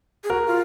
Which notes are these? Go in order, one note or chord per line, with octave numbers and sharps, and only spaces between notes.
G#4
F#4 A#4
F4